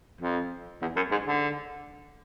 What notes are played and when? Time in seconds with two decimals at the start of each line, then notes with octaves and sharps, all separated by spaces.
0.20 F2
0.82 E2
0.96 F#2
1.11 G#2
1.27 D3